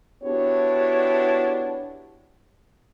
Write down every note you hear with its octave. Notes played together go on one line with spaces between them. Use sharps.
B3 D4 E4 F#4 G4 C#5